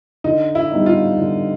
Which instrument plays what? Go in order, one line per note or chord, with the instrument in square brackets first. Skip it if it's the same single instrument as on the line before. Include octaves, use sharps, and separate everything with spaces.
[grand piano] D3 [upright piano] D#4
[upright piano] E4
[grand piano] G3 B3 D#4
[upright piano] F4
[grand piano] D3